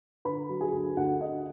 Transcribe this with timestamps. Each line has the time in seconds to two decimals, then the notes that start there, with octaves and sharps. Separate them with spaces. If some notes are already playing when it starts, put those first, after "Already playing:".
0.25 D3 B4 B5
0.49 F#3
0.61 G#4 G#5
0.73 D2
0.97 D2 F#4 F#5
1.21 D3 D#5